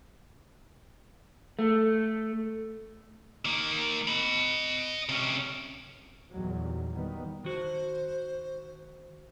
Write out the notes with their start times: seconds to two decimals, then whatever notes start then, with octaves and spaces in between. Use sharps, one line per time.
1.59 A3
3.45 D#3 A#3
4.08 D#5 B5
5.09 C3 C#4
6.31 E2 A#2 D#3 F#3 G3
6.92 D#3 G3 B3
7.44 D#3 F#4 C5